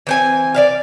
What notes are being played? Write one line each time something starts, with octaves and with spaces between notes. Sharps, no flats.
E3 C4 G#5
D5 E5 F5